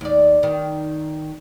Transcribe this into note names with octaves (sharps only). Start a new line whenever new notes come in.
D#2 D5
D#3